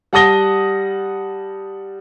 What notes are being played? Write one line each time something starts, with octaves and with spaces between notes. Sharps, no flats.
G3 F#5 A5 D#6 A#6 G7